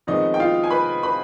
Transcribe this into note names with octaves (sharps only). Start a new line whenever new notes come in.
F2 D#3 G#3 B3 D#4 D#5
G5
F4 F5
G#5
B4 B5
B4 B5